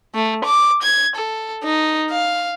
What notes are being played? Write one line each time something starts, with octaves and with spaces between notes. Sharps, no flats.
A3
D6
G#6
A4
D#4
F5